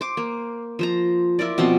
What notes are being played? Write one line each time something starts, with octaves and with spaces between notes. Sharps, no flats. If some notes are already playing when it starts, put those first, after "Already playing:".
C5 D6
A#3
F3 C5 A#5
E4 F4 A#4 D5
B2 F3 C4 C6